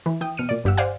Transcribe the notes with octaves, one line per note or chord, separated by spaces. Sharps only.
E3
E3 G5 D#6
B2 F6 C#7 D#7
A#2 D5
G1 G2 G4 F#5 E6
C5 D5 F5 F#5 G#5